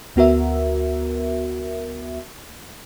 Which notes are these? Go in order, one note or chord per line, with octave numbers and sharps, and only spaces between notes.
D2 B3 F#4 A#4 E5